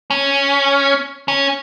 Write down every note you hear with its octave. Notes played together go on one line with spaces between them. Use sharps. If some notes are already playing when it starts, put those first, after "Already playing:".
C#4
C#4